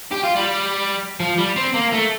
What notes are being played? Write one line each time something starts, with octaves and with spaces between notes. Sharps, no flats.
G4
F4
G3
F3
G3
C4
A#3
A3